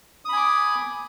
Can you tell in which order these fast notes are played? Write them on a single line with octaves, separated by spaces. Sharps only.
D#6 B5 G#5 D6